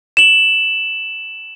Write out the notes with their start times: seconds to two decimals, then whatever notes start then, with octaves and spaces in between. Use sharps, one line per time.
0.17 E7 F#7